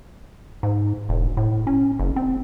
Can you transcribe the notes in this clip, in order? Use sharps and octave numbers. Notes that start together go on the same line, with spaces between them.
G#2
E1
A2
C#4
F#1
C4